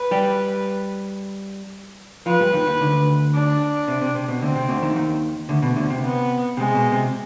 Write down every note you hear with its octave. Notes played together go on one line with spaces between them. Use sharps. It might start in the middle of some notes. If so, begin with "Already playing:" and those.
Already playing: B4
G3 G4
F3 F4 B4
G2 G3
D#2 D#3
D#2 D#3
D2 D3
D4
C3
C3
C3
B2
D2 D3 C4
C3
D2 D3
D#2 D#3
D#2 D#3
D2 D3
B2
D2 D3
C3
B3
C3 G#3
B2
C3